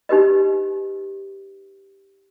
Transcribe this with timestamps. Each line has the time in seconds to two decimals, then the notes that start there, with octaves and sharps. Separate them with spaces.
0.09 D#4 G4 B4 D#5